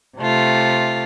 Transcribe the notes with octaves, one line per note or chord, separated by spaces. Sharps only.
C3 A3 F4